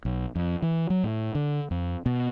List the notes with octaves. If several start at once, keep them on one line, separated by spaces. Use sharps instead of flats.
B1
F2
E3
F#3
A2
D3
F2
B2